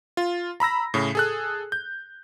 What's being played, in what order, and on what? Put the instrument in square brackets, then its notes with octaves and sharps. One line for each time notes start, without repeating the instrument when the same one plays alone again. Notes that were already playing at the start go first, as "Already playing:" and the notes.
[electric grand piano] F4
A#5 B5 E6 A#6
A2 C#3
G#4 A4 F#6
G6